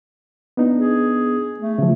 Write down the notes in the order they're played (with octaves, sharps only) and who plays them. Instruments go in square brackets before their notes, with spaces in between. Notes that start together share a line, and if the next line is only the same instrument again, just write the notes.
[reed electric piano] B3 D4 D#4
[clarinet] G#4
A3
[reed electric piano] C#3 F3